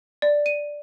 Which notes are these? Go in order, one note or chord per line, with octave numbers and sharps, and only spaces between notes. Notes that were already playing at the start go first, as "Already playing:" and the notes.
D5
D#7